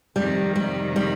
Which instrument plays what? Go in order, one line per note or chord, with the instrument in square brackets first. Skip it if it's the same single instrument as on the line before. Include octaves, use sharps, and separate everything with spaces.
[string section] F2 C3 D#3 [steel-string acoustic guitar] G3
[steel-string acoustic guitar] G3
G3